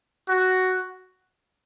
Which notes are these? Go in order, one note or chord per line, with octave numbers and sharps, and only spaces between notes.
F#4